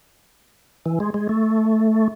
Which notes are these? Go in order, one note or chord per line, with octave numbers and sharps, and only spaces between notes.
E3
G#3
G#3
A3